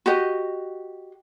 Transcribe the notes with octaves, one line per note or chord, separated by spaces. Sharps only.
F#4 G4 D#5